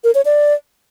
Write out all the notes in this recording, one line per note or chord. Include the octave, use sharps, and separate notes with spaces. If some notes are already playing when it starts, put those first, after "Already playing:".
A#4
C#5
D5